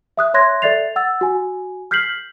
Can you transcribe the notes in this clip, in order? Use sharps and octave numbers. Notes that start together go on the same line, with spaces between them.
E5 D#6 F#6
C#5 E5 C6 F#6 G#6 A#6
A4 D5 E5 A6 C7 F7
F#5 E6 A6
F#4 G#5
F6 G6 B6 C7 F#7